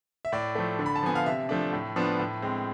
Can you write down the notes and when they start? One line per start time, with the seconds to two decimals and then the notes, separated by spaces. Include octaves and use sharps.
0.25 E5
0.32 A2 D5
0.55 F3 A3
0.79 D3
0.86 B5
0.96 A5
1.03 F3 B3 G#5
1.15 F5
1.26 C3 E5
1.49 F3 A3 D4
1.73 A2
1.96 F3 B3 D4
2.19 A2
2.42 G#3 C4